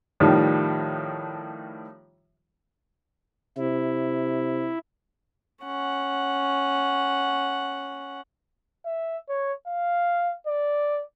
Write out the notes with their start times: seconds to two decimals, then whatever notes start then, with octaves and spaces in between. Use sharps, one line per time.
0.20 A2 D#3 F3 G3
3.58 C3 E4
5.64 C#4 F#5
8.86 E5
9.29 C#5
9.67 F5
10.47 D5